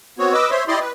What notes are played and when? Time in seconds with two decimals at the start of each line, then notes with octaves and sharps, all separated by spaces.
0.19 B3 C4 F#4 C#5
0.33 B4 D#5 D6 E6
0.51 C5 C#5 E5 C6
0.68 E4 G4 D5 D#5 C6
0.81 B4